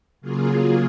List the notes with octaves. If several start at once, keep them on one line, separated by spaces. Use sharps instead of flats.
C#3 F#3 A#3 F4 G#4